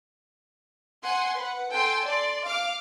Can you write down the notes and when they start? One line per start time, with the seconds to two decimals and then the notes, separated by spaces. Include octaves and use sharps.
1.04 F#5 G#5 C6
1.37 B4 F#5
1.71 A4 G5 G#5 C6
2.06 D5 C6
2.45 F5 D6 F6